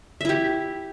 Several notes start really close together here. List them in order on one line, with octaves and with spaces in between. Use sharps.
E5 E4 G4